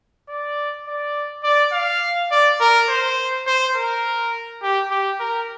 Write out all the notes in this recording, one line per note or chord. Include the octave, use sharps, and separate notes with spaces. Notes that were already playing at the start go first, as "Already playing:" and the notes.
D5
D5
D5
F5
D5
A#4
C5
C5
A#4
G4
G4
A#4